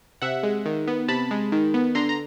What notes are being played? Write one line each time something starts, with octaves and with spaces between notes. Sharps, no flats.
C3 E5 F#5
G#3
D#3
B3
C3 A5 B5
G#3
D#3
B3
D3 A#5 C6
A#5